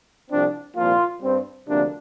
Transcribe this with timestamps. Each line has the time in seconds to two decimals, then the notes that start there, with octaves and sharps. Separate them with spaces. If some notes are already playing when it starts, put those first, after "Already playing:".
0.30 C2 C3 F3 C4 D4
0.75 C2 A#2 F3 A#3 F4
1.22 G2 G3 C4
1.67 D2 C3 F3 A#3 D4